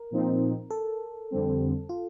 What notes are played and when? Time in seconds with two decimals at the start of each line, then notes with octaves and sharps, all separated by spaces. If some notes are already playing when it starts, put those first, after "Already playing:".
Already playing: A#4
0.11 A#2 F3 C4 D#4
0.70 A4
1.31 F2 D3 G3 C4
1.89 F4